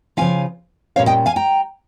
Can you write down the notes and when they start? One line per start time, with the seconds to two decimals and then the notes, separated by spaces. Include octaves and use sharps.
0.17 C#3 F3 A#3 C#4 F4 F5 G#5
0.96 A#2 G3 C#4 C#5 F5
1.06 D#5 G5
1.26 F5 G#5
1.36 G5 A#5